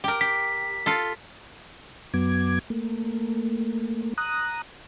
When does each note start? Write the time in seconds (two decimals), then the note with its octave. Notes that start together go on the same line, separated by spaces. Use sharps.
0.04 G4 A#4
0.21 G4 B6
0.86 F4 A4
2.14 F#2 F#3 B3 D6 G#6
2.70 A3 A#3
4.18 A#5 D#6 F#6